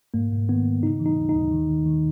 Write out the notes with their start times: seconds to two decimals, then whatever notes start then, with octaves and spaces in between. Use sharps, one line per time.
0.14 G#2 A#3
0.32 G#2
0.49 D#3 B3
0.66 G#2
0.83 C#3 D#4
1.00 E3
1.06 D#4
1.17 D#2
1.29 D#4
1.35 D#2
1.52 D#3
1.69 D#3
1.86 D#3